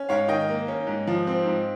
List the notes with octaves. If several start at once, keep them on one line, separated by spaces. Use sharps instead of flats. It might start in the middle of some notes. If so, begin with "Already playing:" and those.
Already playing: C#4
G#2 C#5 F5
D#3 D#5 G5
A#3
C#4
G#2
F3
C4
G#2